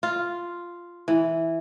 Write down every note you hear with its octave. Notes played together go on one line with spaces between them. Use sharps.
F4
E3